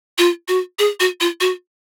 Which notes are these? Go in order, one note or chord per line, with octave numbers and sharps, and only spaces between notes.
F4
F#4
G#4
F#4
F4
F#4